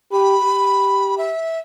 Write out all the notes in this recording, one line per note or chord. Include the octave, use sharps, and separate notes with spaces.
G4 B5
G4
E5